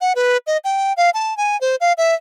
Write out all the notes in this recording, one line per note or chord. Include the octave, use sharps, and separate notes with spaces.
F#5
B4
D#5
G5
F5
A5
G#5
C5
F5
E5